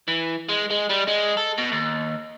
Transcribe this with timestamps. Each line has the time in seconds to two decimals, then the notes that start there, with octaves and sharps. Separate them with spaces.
0.08 E3
0.49 G#3
0.70 G#3
0.90 G3
1.08 G#3
1.37 A4
1.58 B2
1.72 D#2